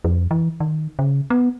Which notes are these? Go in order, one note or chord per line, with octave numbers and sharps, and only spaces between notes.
F2
E3
D#3
C#3
B3